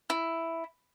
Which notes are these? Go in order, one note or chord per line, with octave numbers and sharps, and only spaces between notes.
E4